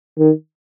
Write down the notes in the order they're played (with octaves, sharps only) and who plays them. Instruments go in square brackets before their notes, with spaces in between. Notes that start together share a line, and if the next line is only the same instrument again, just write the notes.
[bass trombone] D#3